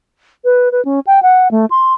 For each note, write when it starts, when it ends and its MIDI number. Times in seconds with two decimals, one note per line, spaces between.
0.44 0.69 71
0.72 0.83 71
0.85 1.00 61
1.07 1.22 79
1.23 1.48 78
1.51 1.66 57
1.70 1.93 84